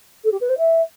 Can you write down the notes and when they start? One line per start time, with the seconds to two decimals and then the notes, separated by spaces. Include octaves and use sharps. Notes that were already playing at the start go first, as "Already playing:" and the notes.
0.24 A4
0.32 G4
0.41 B4
0.49 C5
0.58 E5